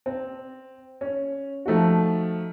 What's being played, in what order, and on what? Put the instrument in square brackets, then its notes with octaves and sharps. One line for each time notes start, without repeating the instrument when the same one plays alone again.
[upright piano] C4
C#4
F3 A3 D#4 F#4